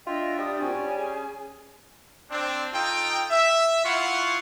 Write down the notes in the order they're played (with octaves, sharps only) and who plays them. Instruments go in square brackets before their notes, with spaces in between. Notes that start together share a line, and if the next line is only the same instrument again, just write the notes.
[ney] D4 [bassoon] F4 [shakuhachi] D#5 [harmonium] E5 G5
[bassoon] G3 [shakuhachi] D#6
[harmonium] A#2 C4 F#4 [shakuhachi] G#5
[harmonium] C#4
[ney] G#4
[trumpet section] C4 D4
D#4 F4 A4 G5
E5
E4 F4 F5 F#5 C#6